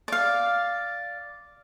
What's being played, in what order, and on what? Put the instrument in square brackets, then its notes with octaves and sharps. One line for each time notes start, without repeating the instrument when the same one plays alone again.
[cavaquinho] D5 F5